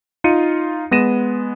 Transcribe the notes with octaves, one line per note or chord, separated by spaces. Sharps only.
D#4 F4 C#7 D#7
G#3 B3 A#6 D#7 E7